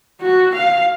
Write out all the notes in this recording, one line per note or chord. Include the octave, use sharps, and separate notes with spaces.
F#4
F5